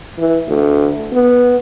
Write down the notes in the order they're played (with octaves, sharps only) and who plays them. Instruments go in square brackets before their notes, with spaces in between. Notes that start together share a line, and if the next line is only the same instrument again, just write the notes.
[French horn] E3
D2
B3